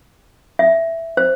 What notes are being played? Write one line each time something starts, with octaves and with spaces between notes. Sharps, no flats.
E5
C5